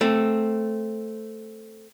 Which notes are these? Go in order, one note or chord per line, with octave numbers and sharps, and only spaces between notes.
A3 C4